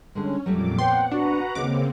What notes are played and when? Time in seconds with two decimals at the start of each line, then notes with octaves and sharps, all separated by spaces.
0.15 D3 G3 G#3 C#4
0.46 F2 A#2 F#3 G3 A3 D6
0.79 B3 C4 C#5 F#5 G5 C6
1.11 D4 F#4 B4 F#5 A#5
1.55 D#2 C#3 A#3 C4 C#4 G#4 D6